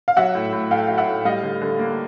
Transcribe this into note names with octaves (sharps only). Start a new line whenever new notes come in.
F5
F#3 E5 F#5
A2
A2
A3 F5 G5
F#3 F5
E5 F#5
A2
G3 D#5 F5
D3
D3
A#3